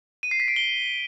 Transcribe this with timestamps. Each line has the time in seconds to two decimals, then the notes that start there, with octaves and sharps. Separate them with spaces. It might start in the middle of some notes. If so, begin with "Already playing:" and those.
0.23 D#7
0.31 C7
0.40 B6
0.48 D7
0.56 G7